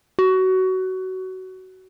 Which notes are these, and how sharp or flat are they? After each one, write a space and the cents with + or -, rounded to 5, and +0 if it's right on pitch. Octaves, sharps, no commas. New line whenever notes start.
F#4 +20